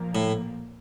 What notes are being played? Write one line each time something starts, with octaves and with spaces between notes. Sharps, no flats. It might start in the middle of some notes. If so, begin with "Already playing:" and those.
Already playing: A#2 F3 A#3
A2